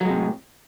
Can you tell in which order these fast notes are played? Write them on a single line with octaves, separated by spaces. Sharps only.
F#3 G#3 C3 A2